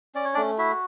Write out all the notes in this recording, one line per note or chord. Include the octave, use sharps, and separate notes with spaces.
C#4 D5
C#5
D4 D5
A3
E4 F#4 E5